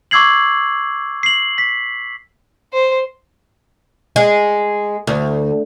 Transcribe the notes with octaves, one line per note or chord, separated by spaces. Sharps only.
C#6 D6 E6 G#6 C7 F#7
C7 F#7
B6
C5
G#3
D2